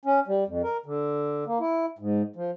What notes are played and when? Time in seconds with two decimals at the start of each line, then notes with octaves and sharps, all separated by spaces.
0.05 C#4
0.27 G3
0.47 F2
0.64 A#4
0.86 D3
1.47 A#3
1.60 E4
1.99 G#2
2.36 F3